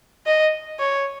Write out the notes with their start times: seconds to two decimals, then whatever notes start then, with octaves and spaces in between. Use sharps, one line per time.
0.26 D#5
0.80 C#5